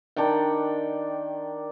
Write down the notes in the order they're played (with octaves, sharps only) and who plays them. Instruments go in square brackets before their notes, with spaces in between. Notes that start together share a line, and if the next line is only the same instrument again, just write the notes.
[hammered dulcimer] D#3 D4 F#5 G5